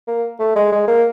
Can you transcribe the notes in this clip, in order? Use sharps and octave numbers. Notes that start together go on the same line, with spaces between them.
A#3
A3
G#3
G#3
A#3